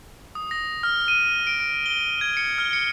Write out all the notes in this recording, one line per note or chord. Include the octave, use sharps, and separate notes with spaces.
D#6
A#6
F6
D#7
D7
D7
G7
G#6
C#7
F6
C#7